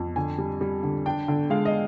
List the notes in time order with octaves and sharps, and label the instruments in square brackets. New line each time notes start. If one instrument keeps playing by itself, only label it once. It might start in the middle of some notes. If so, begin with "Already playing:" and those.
Already playing: [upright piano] F2
D3 G#5
G3
G3
D3
D4 G5
D3
G#3 F5
D#5